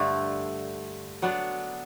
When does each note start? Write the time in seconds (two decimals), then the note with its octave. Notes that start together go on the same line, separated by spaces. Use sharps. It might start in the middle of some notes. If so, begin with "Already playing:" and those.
Already playing: G2 D3 A3
1.22 F#3 B3 D4